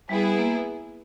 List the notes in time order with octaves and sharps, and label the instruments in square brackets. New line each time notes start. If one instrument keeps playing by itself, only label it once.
[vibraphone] G3 [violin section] B3 E4 G#4
[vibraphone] A#3